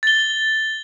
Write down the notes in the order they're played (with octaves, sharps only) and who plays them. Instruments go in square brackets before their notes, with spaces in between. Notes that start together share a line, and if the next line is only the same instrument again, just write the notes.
[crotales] A6 G7